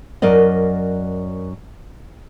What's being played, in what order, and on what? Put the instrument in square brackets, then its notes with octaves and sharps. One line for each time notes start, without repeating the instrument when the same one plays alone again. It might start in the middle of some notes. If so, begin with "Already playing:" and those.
[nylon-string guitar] F#2 A#4 D5 D#5